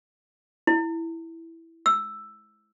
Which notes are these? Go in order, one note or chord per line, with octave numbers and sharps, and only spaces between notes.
E4
E6